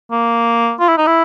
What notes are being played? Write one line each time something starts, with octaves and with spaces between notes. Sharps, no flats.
A#3
F4
E4
D#4
E4